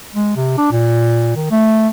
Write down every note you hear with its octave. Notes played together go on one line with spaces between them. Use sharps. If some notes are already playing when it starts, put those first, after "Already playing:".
G#3
C3
D4
A#2
D#3
A3